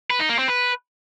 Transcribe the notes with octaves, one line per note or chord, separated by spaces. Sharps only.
B4
D#4
A#3
C4
B4